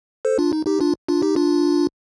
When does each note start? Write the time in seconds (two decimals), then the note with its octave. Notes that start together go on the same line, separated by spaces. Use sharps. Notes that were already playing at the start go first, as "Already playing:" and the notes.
0.25 A4 C5
0.39 D4 F4
0.53 D#4
0.66 D#4 G4
0.80 D4 F4
1.08 D4 F4
1.22 D#4 G4
1.36 D4 F4